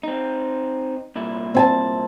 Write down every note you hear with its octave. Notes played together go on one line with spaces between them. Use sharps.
C4 D#4
C2 A#2 E4
C4 G#5 A5